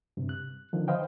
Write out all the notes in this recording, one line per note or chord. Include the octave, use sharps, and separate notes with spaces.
G2 C3
F#6
D3 D#3 F3
B4 C5 D#5 F5 G5